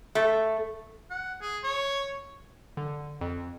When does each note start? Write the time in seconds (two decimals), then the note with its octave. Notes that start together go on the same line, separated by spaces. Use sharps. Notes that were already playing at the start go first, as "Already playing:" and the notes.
0.15 A3
1.10 F#5
1.41 G#4
1.63 C#5
2.77 D3
3.21 F2